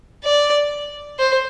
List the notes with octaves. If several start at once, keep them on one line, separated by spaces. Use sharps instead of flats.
D5
C5